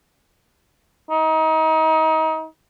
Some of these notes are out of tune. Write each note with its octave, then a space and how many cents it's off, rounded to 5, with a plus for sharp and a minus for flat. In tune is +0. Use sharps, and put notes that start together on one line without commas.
D#4 +30